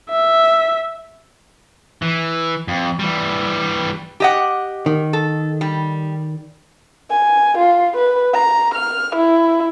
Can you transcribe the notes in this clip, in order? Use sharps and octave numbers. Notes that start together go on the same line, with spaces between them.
E5
E3
F2
E3 G3
G4 D#5 F#5
D#3
A4
G3
G#5
F4
B4
A#5
F6
E4